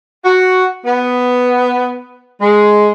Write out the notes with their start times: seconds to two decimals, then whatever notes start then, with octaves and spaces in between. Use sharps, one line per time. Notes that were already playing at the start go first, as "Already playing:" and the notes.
0.24 F#4
0.85 B3
2.41 G#3